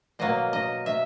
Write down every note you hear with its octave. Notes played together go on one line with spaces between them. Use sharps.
B2 F#3 A#3 D#5
D#5
E5